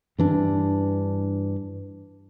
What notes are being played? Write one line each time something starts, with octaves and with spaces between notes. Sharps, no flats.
G2 E3 D4